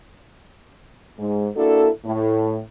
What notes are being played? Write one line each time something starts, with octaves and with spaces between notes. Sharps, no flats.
G#2
A#3 D4 E4 F#4 A4
A2